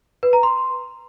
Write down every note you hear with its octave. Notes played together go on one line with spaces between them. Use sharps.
B4
A#5
C6